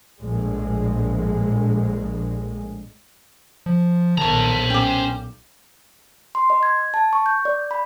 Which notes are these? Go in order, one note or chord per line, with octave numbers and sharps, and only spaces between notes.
A#1 A2 G#3
F3
B1 A#2 D#3 C5 A5 A#5 C#6
C#4 G5 D6
C6
D#5
G#6
A5
C#6
G6
D5
B5